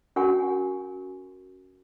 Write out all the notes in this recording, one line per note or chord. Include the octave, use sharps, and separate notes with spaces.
C#4 F#4 A#4 F#5 G#5 C#6